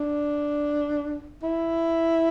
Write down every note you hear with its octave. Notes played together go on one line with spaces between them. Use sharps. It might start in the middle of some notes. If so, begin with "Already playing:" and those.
Already playing: D4
E4